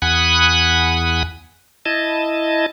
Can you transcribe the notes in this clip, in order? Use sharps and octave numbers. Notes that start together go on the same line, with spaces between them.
E2 F#5 G#5 B5 D#6 F#6
E4 D#5 A5